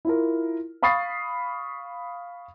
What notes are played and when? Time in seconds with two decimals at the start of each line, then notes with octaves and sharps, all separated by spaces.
0.05 E4 F4 A#4
0.82 F5 B5 C#6 D#6 A6 C7